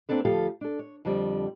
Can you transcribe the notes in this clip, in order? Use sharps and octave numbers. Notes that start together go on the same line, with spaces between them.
A#3 C4 D4 A4 B4
D2 F3 G4 A4 F5
D4 A4
C#5
F2 D3 F3 G3